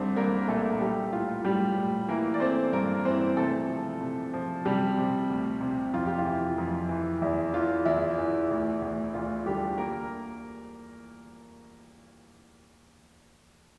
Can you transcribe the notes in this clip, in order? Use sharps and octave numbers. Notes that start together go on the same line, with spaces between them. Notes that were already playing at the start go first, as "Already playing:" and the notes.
Already playing: C2 A3 C4 D4 C5
C2 A#3 A#4
A#2 A3 A4
G3 A3 G4
A2 F4
A2 G3 G4
A2
E3 A#3 A#4
D5
A3 C4 C5
G2 A#3 A#4
E3 C4 C5
C3 A3 A4
F3
C3
F3
C3 G3 G4
C3
D2
C3
F2 F4
G4
F4
E3
F2
E3
E2 E4
E3 F4
E2 E4
E3
D2
D2
D2 F4
D3 G3 G4
A#3 A#4